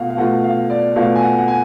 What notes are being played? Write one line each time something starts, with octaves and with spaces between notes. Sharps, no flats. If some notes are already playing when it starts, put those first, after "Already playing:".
Already playing: B2 A3 F4 F5 F#5
F5
B2 A3 F4 F#5
F5
D5
B2 A3 F4 F5
G#5
F#5
F#5
G#5